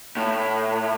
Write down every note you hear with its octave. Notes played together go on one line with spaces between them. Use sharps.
A2